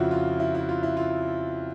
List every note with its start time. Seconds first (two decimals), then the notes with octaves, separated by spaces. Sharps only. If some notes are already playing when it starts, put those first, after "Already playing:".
Already playing: F2 C#3 F3 E4 F#4
0.11 F4
0.40 E4
0.55 E4
0.69 F4
0.83 E4
0.97 F4